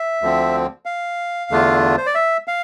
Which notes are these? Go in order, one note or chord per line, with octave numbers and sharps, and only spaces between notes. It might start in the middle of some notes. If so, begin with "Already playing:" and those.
Already playing: E5
D2 D3 F3 C4
F5
E2 D3 A3 D4 F4
C5
D5
E5
F5